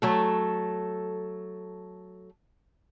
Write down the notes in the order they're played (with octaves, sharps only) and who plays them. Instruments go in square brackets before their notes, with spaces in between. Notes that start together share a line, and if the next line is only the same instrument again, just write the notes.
[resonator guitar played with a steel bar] F#3 A3 A4